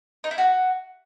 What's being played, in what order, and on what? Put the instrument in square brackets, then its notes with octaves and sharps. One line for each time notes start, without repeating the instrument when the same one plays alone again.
[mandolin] D#4
E4
F#4